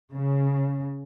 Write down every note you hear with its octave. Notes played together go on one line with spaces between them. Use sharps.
C#3